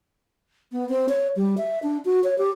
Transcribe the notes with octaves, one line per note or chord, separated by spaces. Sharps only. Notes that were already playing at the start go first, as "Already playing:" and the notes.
B3
C4
C#5
G3
E5
D4
F#4
C#5
G4